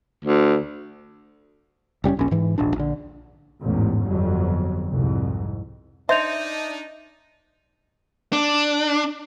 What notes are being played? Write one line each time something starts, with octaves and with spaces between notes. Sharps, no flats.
D2
F#1 G3 C4 C#4
D#1 A#1 C#4
G#2 E3
D#1 A#1 D4
A#1 D3
A1 E2 G#2
G1 F2 F#3
C2 F2 G#2
D4 D#4 C5 D#5 E5 G6 F7
D4